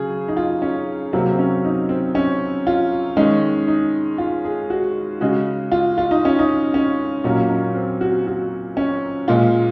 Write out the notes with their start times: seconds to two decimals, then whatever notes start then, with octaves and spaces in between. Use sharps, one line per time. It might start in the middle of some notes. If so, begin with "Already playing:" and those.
Already playing: C#3 F#3 G#4
0.28 D#4
0.37 F4
0.62 C#4
1.13 C3 F#3 A#3 C4
1.32 C4
1.39 C#4
1.65 D#4
1.89 C4
2.15 C#4
2.67 F4
3.17 D#3 G#3 C#4
3.68 D#4
4.18 F4
4.44 G#4
4.70 F#4
5.21 C#3 G#3 F#4
5.72 F4
5.98 F4
6.11 D#4
6.25 C#4
6.39 D#4
6.74 C#4
7.24 A#2 F#3 A#3 C#4
7.50 C#4
7.75 C4
8.01 F#4
8.27 F#4
8.77 C#4
9.28 A#2 G#3 F4